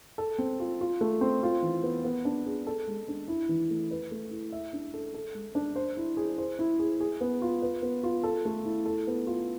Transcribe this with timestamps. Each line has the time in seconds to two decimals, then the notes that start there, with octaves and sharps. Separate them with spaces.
0.18 A4
0.39 C4
0.60 F4
0.81 F4
1.01 A3
1.21 C4
1.43 F4
1.62 E3
1.83 B3
2.04 B3
2.25 D4
2.46 G#4
2.67 A4
2.88 G#3
3.08 D4
3.28 E4
3.49 E3
3.70 A3
3.91 B4
4.11 A3
4.31 E4
4.52 E5
4.73 D4
4.94 A4
5.14 A4
5.34 G#3
5.55 D4
5.76 C5
5.97 E4
6.17 G#4
6.38 C5
6.59 E4
6.79 G#4
7.00 G#4
7.21 B3
7.42 F4
7.62 B4
7.82 B3
8.04 F4
8.23 A4
8.45 A3
8.65 E4
8.85 A4
9.07 B3
9.27 F4